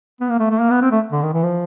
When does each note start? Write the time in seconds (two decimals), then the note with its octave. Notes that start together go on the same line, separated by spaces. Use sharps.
0.21 B3
0.29 A#3
0.39 A3
0.50 A3
0.60 A#3
0.70 B3
0.82 C4
0.91 A3
1.12 D3
1.22 D#3
1.33 E3
1.43 F3